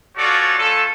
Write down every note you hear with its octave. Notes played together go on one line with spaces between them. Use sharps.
C#4 F4 F#4 A4 C#5 D5
A3 C#4 F4 A4